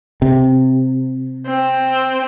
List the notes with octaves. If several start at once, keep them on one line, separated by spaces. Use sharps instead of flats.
C3
C4